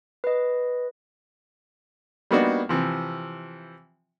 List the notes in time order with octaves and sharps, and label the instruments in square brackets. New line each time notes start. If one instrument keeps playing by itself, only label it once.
[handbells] B4 D#5
[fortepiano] G3 A#3 B3 D4 D#4 F#4
C3 E3 F3